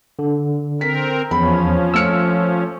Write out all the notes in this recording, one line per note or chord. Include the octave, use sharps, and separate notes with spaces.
D3
C4 A#4 B6
E2 F3 C#4 B5
A3 E6 F6 C#7